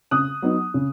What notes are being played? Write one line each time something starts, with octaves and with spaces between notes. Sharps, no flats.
C#3 D#6 F#6
F#3 B3 D#4
C#3